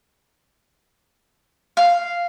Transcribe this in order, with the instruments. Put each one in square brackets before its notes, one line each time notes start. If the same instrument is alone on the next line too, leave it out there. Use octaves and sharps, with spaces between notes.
[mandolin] F5